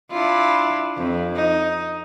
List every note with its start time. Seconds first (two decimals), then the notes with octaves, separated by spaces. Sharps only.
0.11 D4 E4 F4
0.97 F2
1.36 D#4